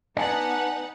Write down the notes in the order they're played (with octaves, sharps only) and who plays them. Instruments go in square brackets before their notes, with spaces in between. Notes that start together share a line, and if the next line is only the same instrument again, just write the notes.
[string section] B3 D#4 F#5 [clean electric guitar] D5 G#5 A5